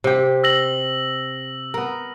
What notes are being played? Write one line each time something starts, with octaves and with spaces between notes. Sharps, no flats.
C3 G4
E6 A#6 F#7
B3 A#4